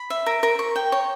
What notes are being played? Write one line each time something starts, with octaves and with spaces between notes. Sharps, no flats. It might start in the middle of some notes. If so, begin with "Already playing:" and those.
Already playing: B5
E5
A#4
A#4
C#6
G5
C#5